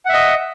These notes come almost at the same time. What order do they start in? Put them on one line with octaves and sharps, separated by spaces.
F#5 E5 D#5